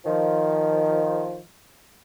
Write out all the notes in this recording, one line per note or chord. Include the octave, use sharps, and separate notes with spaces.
D#3 F3